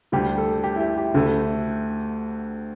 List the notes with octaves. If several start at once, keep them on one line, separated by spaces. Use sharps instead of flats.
D2 D3 G3 G4
A4
G4
E4
G4
G4
D2 D3 A3